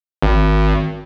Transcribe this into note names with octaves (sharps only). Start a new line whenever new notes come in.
G#1